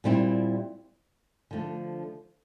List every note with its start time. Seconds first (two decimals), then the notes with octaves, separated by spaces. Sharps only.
0.04 A#2 G3 C4 E4
1.51 D3 F3 A3